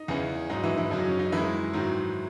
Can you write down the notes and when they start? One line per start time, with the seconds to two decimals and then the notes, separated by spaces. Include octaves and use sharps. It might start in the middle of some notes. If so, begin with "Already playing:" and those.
Already playing: D#4
0.08 E2 C#3 E3
0.50 G#2 F#3 D#4
0.63 E3 E4
0.77 E3 E4
0.91 F#2 C#3 F#3 D#4
1.04 C#4
1.19 D#4
1.32 F#2 D#3 E3 G#3 E4
1.73 G#2 D#3 F#3